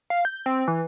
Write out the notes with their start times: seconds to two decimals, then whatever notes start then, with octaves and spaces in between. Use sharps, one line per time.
0.10 F5
0.25 G6
0.46 C4
0.68 E3